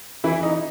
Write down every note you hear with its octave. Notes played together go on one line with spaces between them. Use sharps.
E3 E4
D#4